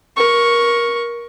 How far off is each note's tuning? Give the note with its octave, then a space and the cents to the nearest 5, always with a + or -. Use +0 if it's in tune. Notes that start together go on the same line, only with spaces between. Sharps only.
A#4 +20 C#6 +0